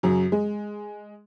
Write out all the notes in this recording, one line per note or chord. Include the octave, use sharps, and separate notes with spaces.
F#2 C#3 F#3
G#3